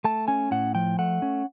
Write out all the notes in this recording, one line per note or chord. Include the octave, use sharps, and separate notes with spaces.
A3 A5
C#4 G#5
A2 F#5
F3 G5
A3 F#5
C#4